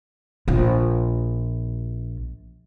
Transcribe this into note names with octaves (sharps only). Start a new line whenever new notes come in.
A#1 F4